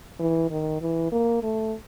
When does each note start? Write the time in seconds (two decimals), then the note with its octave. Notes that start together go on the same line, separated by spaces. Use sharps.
0.20 E3
0.50 D#3
0.81 E3
1.12 A#3
1.43 A3